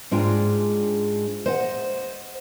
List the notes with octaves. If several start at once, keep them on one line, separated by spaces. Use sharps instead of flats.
G#2 G#3 D4 F4 G5
C5 D#5 F#5